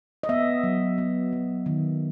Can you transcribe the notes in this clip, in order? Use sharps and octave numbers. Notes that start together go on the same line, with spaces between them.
D#5
B3 E5
F#3
B3
F#3
D#3